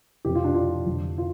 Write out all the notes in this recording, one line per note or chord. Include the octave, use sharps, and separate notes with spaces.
F1 F2 C3 F3 G4
F4
D4
F4
F1 F2 D3 F3
F4